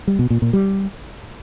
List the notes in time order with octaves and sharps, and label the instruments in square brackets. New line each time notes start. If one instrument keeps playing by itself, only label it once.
[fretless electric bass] G3
B2
A#2
A#2
G3